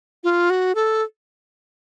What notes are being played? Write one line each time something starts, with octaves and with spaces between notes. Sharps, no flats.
F4
F#4
A4